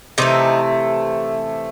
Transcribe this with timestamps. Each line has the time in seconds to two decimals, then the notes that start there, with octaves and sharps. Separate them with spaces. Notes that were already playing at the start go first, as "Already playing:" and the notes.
0.18 C3 E3 A3 D#4